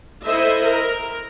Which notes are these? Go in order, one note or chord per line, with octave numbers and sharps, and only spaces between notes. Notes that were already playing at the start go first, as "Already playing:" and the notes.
E4 A4 C5 D#5 E5
A#4